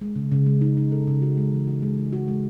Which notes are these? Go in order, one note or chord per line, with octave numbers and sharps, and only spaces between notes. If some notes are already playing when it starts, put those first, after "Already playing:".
G#3
C#3
C#3
G#3
D#4
D#4
A4
C#3
F#4
G#3
E3
F#4
G#3
D#4
F#4
G#3